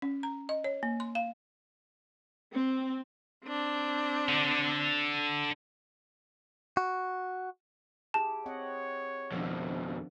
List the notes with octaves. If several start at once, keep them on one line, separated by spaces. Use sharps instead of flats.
C#4
A#5
D#5
C#5
A#3
C6
F5
C4
C4 D4
D3
F#4
E4 G4 G#4 A5
C4 C#5 D#5 F#5
F2 B2 D#3 F3 D4